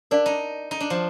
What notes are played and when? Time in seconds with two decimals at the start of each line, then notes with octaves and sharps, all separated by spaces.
0.11 D4 A#4 D5 F5
0.26 D#4
0.71 D#4
0.80 D4
0.90 F3